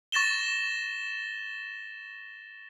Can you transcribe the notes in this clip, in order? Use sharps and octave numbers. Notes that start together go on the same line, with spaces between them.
C#6 A6 A#6 E7 G7